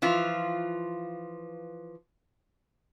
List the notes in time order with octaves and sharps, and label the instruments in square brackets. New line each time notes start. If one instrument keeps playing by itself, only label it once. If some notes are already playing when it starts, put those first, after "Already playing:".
[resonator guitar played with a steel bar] E3 F3 F4